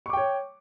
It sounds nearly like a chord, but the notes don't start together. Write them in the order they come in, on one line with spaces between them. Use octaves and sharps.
C#6 D6 G5 C#5